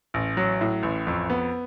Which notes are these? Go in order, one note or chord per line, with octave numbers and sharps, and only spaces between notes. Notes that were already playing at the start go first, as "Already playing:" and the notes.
A1
F#3
A2
A1
F2
B3